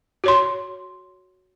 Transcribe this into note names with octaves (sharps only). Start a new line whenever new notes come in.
F#4 C#5 C6